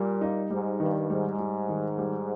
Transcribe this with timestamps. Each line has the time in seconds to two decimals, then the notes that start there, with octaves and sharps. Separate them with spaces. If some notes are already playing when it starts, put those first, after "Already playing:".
Already playing: A#2 G3
0.21 D#4
0.50 G#2 G3
0.80 G2 D#3
1.09 G#2 G3
1.38 G3
1.69 D#3
1.98 G3